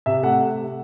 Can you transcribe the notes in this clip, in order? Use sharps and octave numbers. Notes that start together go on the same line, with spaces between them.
C3 E5
A3 F#5